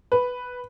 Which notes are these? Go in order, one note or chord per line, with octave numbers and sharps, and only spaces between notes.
B4